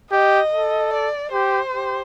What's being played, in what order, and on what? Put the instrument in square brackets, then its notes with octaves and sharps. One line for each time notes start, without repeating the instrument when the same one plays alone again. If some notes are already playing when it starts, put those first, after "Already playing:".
[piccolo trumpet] G4 [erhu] D#5
[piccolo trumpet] A4
[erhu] D5
[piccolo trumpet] G4 [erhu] C5
[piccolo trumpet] G4